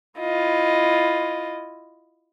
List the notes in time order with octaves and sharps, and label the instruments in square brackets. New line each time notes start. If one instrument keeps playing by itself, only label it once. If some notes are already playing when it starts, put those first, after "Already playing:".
[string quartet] E4 F4 D#5